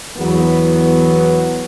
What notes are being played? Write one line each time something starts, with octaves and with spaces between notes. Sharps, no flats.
E2 F#3 B3